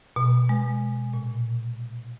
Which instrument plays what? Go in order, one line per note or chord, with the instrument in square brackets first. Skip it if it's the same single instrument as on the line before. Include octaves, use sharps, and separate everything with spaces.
[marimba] B2
G#3
A#2